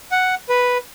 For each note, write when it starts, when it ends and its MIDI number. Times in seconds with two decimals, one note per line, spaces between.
0.12 0.35 78
0.49 0.78 71